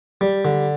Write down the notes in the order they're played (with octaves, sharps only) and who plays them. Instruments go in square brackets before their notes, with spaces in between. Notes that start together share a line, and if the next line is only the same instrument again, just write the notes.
[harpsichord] G3
D3